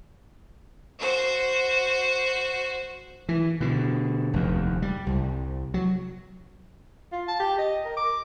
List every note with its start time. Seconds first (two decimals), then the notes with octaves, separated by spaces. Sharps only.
0.99 F#4 C5
3.29 E3
3.61 B2 D3
4.33 F1 D#2
4.82 G3
5.07 C2
5.74 F#3
7.12 F4
7.28 A5
7.40 G4
7.58 D#5
7.85 A#4
7.97 D6